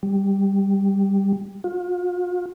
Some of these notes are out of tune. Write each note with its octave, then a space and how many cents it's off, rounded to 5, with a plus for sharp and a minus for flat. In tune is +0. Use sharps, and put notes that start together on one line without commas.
G3 +5
F4 +40